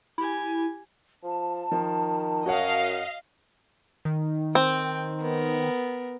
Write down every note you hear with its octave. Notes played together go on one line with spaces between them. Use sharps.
E4 G4 G#5
F3 A5
D#3 F3
F#2 F#4 C#5 D#5 F5 F#5
D#3
C4 G5
B3 A#4